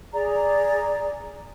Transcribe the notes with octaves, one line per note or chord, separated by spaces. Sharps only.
G#4 D5 A#5